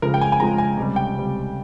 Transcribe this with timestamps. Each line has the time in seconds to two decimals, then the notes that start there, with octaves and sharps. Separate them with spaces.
0.02 C#2 C#3 F3 G#3 A#4
0.14 G5
0.21 G#5
0.32 G#5
0.40 C#2 C#3 F3 G#3 A#5
0.58 G#5
0.77 C#2 C3 G3
0.96 G5
1.15 C#2 C3 G3